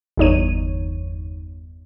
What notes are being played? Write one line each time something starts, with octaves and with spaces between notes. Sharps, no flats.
G1 E2 D#4 C#5 D#7